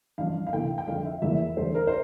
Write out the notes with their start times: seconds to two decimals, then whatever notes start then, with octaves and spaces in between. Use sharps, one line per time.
0.18 A1 G2 F3 F5
0.47 F5
0.53 D2 C3 E3 A3 G5
0.78 G5
0.87 F2 D3 F3 F5
1.05 E5
1.22 F1 E2 E3 A#3 E5
1.57 E2 D3 A3 C5
1.75 A#4
1.87 C5